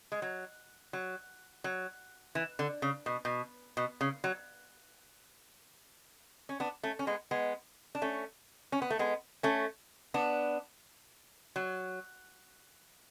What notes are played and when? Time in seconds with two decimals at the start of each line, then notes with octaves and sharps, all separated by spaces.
0.12 G#3
0.22 F#3
0.93 F#3
1.64 F#3
2.35 E3
2.59 D3
2.82 C#3
3.06 B2
3.25 B2
3.77 B2
4.01 C#3
4.24 F#3
6.49 C#4
6.60 B3 D4
6.83 A3 C#4
6.99 C#4
7.07 G#3 B3
7.31 G#3 B3
7.95 D4
8.02 A3 C#4
8.72 C#4
8.82 B3
8.90 A3
8.99 G#3 B3
9.43 A3 C#4
10.14 B3 D4
11.56 F#3